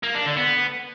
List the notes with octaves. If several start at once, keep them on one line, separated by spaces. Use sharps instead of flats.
A#3
D4
D3
B3